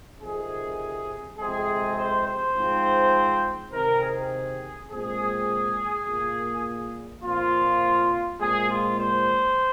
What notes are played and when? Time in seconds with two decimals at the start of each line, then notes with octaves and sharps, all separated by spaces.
0.21 F2 C3 D#3 G#4
1.38 F2 C3 G#3 C4 G#4
1.97 C5
2.26 C5
2.56 G#2 F3 C4
3.72 C3 D#3 C4 A#4
4.01 G#4
4.89 A#2 G#3 C4 G#4
6.06 A#2 A#3
7.22 A#2 F3 C4 F4
8.40 A#2 G#3 C4 G#4
8.68 F4
8.98 C5